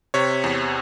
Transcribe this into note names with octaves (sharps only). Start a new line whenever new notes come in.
C3 C#5
E2